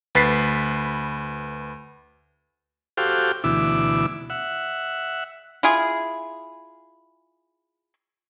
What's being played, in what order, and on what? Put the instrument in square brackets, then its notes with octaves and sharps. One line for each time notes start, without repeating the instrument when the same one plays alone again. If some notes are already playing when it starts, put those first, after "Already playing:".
[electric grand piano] D2 B4 A6 B6 C7
[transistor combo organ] F#4 G4 A4 C5 F5 G5
D2 B2 E3 E4 D6 E6
E5 F#5
[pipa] E4 F4 G#4